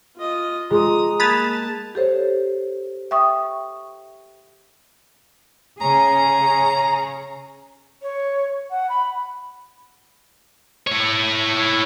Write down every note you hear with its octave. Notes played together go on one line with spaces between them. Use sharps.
F4 D#5
G#3 F4 G#4 A#5 C6 D#6
A#3 A5 B5 D#6 F#6 G#6 A6 F7
G4 A4 C5 C#5
E5 G5 C#6 D#6
C#3 G#4 C#5 A#5
C#5
F#5
B5
E4 C#5